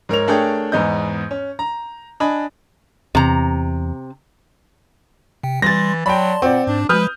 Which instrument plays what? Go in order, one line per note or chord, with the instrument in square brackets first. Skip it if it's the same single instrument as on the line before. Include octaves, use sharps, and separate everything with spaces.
[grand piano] G#2 A#4 C#5 F7
A3 D4 G#4 A#4 C#5 G5
E2 G#2 B3 D#5 G6
C#4
A#5
D4 D#5 G#5 B5
[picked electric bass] E2 [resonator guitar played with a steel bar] C3 A#5
[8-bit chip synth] C3 G5
[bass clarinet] E3 [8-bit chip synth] G3 C6 [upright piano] A6 A#6
[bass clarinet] F#3 [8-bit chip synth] D5 A5 C6 [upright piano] G5 B5
[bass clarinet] A#2 [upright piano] C4 D5 [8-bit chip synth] F#5
[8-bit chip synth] G#2 [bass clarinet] D4
[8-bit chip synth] F3 G#3 [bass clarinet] B4 [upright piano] D#6 F6 G6